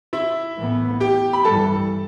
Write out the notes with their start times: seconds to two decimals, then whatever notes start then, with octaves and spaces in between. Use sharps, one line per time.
0.13 E4 E5
0.57 A2 E3 B3
1.00 G4 G5
1.33 B5
1.45 G2 E3 G3 A4 A5